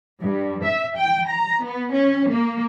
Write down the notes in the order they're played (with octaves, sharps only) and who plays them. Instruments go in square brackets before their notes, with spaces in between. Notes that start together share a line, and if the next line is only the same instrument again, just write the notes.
[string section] G2
E5
G5
A#5
B3
C#4
A#3